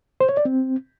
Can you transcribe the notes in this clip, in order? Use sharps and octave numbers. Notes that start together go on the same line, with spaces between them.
C5
C#5
D5
C4